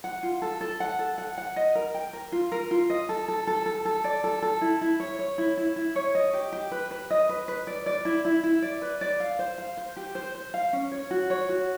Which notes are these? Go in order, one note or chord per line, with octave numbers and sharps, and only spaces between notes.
F#5
F4
A4
A4
F#5
A4
F#5
F#5
D#5
A#4
G5
A#4
F4
A#4
F4
D#5
A4
A4
A4
A4
A4
D5
A4
A4
E4
E4
C#5
C#5
E4
E4
E4
C#5
D#5
G4
G4
B4
B4
D#5
B4
B4
D5
D5
E4
E4
E4
D5
B4
D5
F5
C5
F5
C5
G4
C5
C5
F5
C#4
C#5
F#4
C#5
F#4